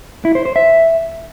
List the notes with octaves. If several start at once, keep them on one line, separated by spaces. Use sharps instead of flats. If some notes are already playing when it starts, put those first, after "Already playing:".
E4
C5
C5
E5